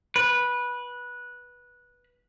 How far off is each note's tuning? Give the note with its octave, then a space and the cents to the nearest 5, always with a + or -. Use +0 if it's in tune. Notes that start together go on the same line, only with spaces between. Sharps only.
B4 -15